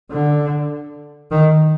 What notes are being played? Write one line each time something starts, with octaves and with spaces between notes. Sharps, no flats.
D3
D#3